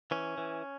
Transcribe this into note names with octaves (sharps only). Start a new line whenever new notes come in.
E3 C#4
E3